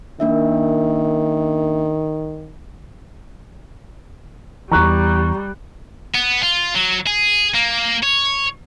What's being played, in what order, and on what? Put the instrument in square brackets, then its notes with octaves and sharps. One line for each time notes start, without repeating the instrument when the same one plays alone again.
[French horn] D#3 [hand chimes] A#3 D4 E5
[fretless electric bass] E2 E3 [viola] G3 [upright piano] A#5 C#6 F#6
[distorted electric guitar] B3
F4
F#3
G#4
A#3
C#5